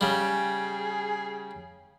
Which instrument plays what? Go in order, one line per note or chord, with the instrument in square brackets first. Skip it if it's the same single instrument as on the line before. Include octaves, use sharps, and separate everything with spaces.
[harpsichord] C#3 G3 [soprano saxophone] G#4